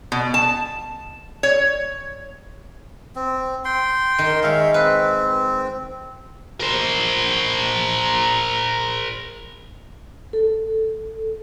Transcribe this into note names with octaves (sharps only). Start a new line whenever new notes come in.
B2
A5
C#5
C4
G5 C6
D#3 A#4
G#3 C#5 E5 F5
C4 B4
A#4 C5
A4